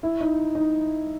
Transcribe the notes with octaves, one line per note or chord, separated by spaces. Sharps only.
E4
D#4
D#4